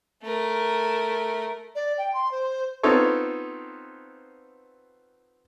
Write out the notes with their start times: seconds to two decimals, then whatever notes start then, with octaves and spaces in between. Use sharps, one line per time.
0.24 A3 A#4
1.75 D5
1.97 G5
2.13 C6
2.31 C5
2.83 B3 C4 D#4 F4 A4 C#5